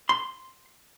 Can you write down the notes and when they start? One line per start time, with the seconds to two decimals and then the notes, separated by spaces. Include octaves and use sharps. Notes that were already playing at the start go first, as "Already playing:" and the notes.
0.09 C6